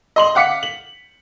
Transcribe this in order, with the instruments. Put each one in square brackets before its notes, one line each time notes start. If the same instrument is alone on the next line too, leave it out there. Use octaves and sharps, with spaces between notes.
[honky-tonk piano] D#5 C6 F#7
F5 F#5 D6 B6 C#7
F#7